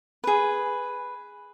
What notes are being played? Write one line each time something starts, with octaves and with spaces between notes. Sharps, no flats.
G#4 B4